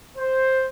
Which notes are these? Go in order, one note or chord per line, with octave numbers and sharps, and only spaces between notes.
C5